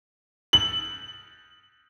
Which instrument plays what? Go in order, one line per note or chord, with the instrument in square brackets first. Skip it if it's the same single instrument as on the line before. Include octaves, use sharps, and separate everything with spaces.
[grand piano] F#7